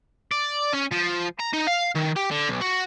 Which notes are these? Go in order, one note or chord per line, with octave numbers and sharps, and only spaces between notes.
D5
C#4
F3
A#5
D#4
F5
D#3
G4
D3
B1
F#4